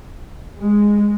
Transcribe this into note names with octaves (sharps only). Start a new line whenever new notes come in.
G#3